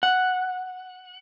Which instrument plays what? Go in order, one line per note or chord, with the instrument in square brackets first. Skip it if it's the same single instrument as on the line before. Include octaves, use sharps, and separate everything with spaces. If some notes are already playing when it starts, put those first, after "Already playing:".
[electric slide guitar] F#5